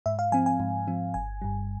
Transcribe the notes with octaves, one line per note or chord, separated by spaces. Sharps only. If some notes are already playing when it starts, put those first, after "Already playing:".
G#2 E5
F5
F3 C4 G#5
G#5
G#2
F3 C4
G1 G#5
G2 G3